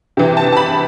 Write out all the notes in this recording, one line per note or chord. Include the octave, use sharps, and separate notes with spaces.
C3 E3
A5
A5
B5